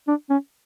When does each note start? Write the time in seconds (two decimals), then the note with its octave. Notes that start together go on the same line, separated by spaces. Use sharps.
0.08 D4
0.30 C#4